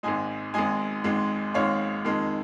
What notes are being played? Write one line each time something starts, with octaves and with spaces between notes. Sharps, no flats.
G#1 G#2 G#3 D#5 G#5
G#1 G#2 G#3 D#5 G#5
G#1 G#2 G#3
G#1 G#2 G#3 C#5 F5
F2 D#3 G#3